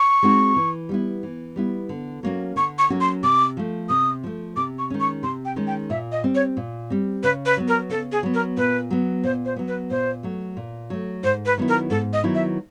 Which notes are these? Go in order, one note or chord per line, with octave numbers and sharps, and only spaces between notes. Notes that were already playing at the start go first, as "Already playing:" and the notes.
Already playing: C#6
G#3 C4 D#4 F#4
E3
G3 B3 E4
E3
G3 B3 E4
D3
F#3 A#3 C#4 F#4
D3 C#6
C#6
F#3 A#3 C#4 F#4
C6
C3 D6
F3 A3
C3 D#6
F3 A3
C3 D6
C#6
D#3 G#3 C#4
C#6
C3 C6
G5
D#3 G#3 C#4
G5
A#2 E5
D#5
G3 C4
C#5
A#2
G3 C4
C#3 B4
B4
F#3 B3
A#4
C#3 A4
G#4
F#3 B3
A#4
A#2 B4
F#3 B3
A#2 C5
C5
F#3 B3
B4
A#2 C5
F#3 A3
A#2
F#3 A3
G#2 C5
B4
D#3 F#3 B3 E4
A#4
G#2 A4
D#5
D#3 F#3 B3 E4
E5